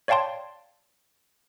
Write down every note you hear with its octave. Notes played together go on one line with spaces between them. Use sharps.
C#5 D5 F5 G5 A5 C6